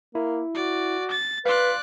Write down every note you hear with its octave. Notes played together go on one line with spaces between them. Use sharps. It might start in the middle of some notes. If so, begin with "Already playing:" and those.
A#3 E4
F#4 D5
A6
B4 D5 F5 C6 F#6